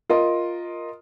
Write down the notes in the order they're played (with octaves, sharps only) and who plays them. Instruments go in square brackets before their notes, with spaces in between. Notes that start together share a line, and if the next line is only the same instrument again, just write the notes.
[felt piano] F4 A#4 D#5